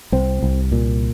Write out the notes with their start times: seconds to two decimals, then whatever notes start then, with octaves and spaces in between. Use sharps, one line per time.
0.12 C2 C4
0.43 C2
0.72 A#2